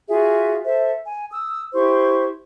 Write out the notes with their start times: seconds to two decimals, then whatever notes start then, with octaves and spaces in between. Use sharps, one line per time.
0.08 F4 F#4 G#4 E5
0.64 A4 C5 E5
1.05 G#5
1.31 D#6 E6
1.74 E4 G4 C5 C#6